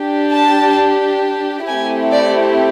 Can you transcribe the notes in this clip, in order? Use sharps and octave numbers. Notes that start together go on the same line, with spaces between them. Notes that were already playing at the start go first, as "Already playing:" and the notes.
Already playing: D4 G4
A5
A3 C4 E4 G4 G#5
D5